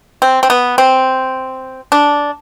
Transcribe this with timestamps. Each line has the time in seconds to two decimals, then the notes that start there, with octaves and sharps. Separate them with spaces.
0.22 C4
0.43 C4
0.50 B3
0.78 C4
1.92 D4